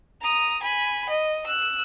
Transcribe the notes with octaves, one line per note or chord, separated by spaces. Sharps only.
A#5 D#6
G#5 B5
D#5
E6 F#6